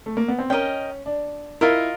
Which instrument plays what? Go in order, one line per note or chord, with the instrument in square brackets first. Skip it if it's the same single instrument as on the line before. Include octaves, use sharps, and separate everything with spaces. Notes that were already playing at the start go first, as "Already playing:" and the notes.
[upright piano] A3
A#3
B3
C4
[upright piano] C#4 [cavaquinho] A#4 D#5 G5
[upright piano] D4
[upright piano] E4 [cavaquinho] F4 A#4 D#5